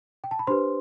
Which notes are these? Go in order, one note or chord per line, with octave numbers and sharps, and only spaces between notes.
G5
A5
B5
D4 G4 B4 C5 C6